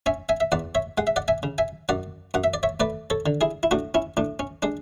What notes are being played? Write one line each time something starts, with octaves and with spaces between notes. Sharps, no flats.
C#4 E5 G#5
E5 G#5
E5
E2 D5 F#5
C#5 E5
G#3 F#5
E5
D5 F#5
E5 G#5
C#3
E5 G#5
F#2 D5 F#5
F#2 F#5
E5
D5
C#5 E5
A3 B4 D5
A4 C#5
D3
E4 G#4
E4
A2 D4 F#4
C#4 E4
A2 D4
C#4
G#3 D4